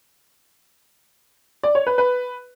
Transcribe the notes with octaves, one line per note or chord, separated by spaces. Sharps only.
D5
C#5
B4
B4